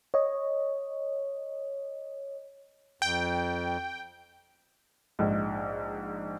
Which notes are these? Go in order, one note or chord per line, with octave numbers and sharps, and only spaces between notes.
C#5 D#5
F2 G5
A#1 G#2